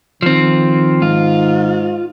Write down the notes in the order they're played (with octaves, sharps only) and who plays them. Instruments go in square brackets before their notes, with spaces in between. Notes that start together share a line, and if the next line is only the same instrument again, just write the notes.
[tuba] D#3 [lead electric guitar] F3 C4
[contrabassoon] G#2 [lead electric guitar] F4